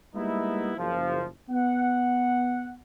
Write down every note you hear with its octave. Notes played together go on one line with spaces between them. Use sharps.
G3 G#3 A#3 B3 D#4 E4
F#1 F3
B3 F#5